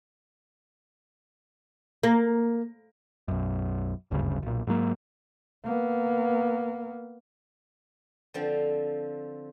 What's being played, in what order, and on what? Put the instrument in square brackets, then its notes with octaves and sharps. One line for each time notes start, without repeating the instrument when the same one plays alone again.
[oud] A#3
[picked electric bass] B1 F#2
F#1 D2 G2 C#3
B1 A#2
G#2 F#3 A#3
[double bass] A#3 B3
[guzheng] D3 F3 C4 F4